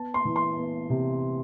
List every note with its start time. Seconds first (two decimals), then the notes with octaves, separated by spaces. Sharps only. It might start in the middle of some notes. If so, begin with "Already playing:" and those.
Already playing: B3 A5
0.14 C6
0.25 E3
0.36 C6
0.57 B3
0.90 C3